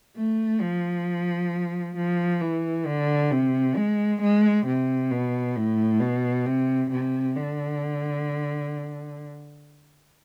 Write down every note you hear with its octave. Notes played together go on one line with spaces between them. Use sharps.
A3
F3
F3
E3
D3
C3
G#3
G#3
C3
B2
A2
B2
C3
C3
D3